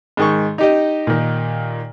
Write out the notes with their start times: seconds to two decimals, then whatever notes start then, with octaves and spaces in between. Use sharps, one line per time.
0.17 G#2 D#3 C#6
0.58 D#4 G4 D#5
1.07 A#2 D#3